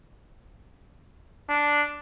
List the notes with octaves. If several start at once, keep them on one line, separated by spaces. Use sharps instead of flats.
D4